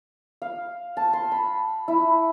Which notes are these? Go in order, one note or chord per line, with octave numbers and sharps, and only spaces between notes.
F5
A5
C6
B5
E4